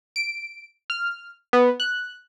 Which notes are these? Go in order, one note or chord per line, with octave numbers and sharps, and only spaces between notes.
D7
F6
B3
F#6